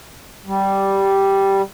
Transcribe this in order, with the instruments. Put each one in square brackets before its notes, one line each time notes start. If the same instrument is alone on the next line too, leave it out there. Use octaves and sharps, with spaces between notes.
[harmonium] G3